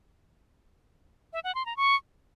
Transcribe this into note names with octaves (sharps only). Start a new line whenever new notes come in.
E5
F#5
C6
A#5
C#6